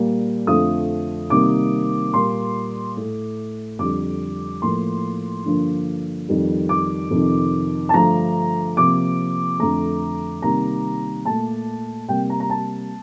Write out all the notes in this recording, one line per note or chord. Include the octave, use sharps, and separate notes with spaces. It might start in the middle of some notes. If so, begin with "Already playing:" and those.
Already playing: A#2 G3 A#3
F2 D3 F3 A3 D#6
C3 D#3 G3 A#3 D6
A#2 G3 A#3 C6
A2 A3
F2 D3 G3 D6
A2 F3 A#3 C6
G2 D3 F3 A#3
F2 D#3 G3
D6
F2 C3 D#3
A5
G2 D3 F3 A3 A#5
C3 F3 A#3 D6
F2 D3 A3 A#5
C3 D#3 G3 A#3 A#5
A#2 A3 A5
C3 G3 A#3 G5
A#5
A#5
A5